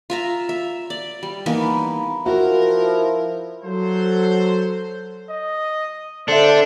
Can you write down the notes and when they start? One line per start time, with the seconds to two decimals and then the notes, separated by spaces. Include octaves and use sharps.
0.10 F4 E5 A#5
0.49 E5
0.90 D5
1.23 G3
1.46 E3 A#3 B3 D#4
2.26 F3 E4 F#4 A#4
3.63 F#3 A4 C5
5.30 D#5
6.28 D3 D4 C5 E5 C#7